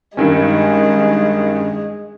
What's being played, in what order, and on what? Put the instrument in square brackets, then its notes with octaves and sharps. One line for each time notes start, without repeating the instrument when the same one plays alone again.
[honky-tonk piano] G2 D#3 C#4 [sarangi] G#3